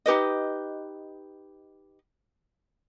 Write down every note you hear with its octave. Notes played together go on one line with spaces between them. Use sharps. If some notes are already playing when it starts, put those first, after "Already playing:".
D#4 G4 B4 D#5